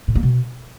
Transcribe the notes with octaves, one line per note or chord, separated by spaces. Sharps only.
A2
A#3
B2